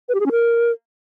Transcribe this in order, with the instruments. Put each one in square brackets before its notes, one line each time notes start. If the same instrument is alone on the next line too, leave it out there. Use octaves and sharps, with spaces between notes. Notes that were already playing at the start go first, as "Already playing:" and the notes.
[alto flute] B4
G4
G#4
C#4
A#4